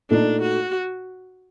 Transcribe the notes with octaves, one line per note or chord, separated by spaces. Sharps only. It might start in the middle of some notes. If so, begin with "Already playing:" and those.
A#2 A3 D4 D#4
F#4